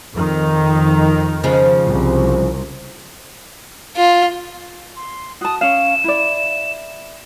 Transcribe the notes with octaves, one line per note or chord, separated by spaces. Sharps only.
F2 D#3
C#3 F3 G#3
C2
F4
C6
F#4 A5 D#6
C#4 F5 E7
E4 D5